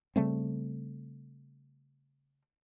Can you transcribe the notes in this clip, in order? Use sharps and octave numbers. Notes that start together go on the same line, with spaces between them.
C#3 G3 A3 C4